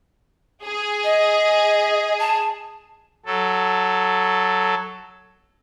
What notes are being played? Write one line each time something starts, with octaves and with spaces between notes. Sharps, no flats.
G#4
D#5
A5
F#3 A4